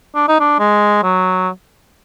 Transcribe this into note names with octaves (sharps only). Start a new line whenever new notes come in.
D4
D#4
D4
G#3
F#3